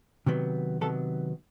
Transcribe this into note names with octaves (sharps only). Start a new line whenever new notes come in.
C3 D#3 F#3 B3
C3 D#3 F#3 B3 A4